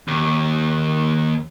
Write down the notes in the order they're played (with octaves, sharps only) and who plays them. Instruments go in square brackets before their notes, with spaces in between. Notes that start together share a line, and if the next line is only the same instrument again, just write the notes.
[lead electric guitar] D#2